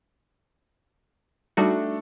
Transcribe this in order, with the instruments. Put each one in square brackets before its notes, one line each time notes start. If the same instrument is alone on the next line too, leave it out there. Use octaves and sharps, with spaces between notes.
[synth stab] G3 D#4 F#4 [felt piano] A3 D4 A4